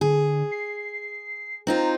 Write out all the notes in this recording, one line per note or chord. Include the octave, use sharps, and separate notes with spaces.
D3 G#4
C7
C4 D#4 F4 A#5